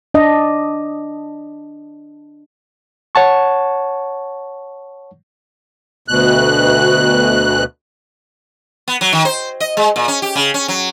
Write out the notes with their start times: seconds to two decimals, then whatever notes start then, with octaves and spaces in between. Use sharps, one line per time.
0.14 D4 D#5
3.15 C#5 F#5 A5 C#6
6.08 D2 B2 F#6
8.88 B3
9.01 F#3
9.13 D#3
9.25 C5
9.60 D#5
9.77 G#3
9.96 A#2
10.08 C#4
10.22 G4
10.35 C#3
10.54 C#4
10.68 F#3